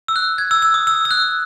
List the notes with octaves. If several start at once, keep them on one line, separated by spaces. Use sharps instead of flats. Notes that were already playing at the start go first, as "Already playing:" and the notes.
E6
F#6
G#6
E6
E6
D#6
E6
E6
F#6